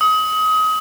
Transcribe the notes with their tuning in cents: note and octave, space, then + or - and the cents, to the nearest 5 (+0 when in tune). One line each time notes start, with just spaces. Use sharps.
D#6 +30